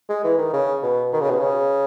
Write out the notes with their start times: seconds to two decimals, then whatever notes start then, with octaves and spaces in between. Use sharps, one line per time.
0.09 G#3
0.24 E3
0.38 D#3
0.53 C#3
0.83 B2
1.13 D#3
1.21 C#3
1.30 B2
1.39 C#3